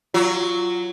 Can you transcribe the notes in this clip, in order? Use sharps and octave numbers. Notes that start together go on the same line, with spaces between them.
F#3 F4